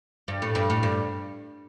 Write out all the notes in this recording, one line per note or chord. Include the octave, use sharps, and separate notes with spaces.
G2
A2
G2
A2
G2